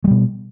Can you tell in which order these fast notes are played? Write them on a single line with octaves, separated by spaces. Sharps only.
G#3 G3 B2